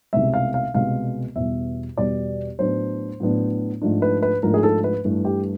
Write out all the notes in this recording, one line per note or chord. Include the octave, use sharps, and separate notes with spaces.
C2 B2 G#3 E5
F5
F5
C2 B2 G#3 F5
E2 B2 G3 E5
E2 B2 G3 D5
A2 F#3 B3 D4 C5
A2 F#3 B3 D4
G#2 F3 A3 D4
B4
B4
G#2 F3 A3 D4 A#4
G#4
A4
B4
G2 E3 A3
G4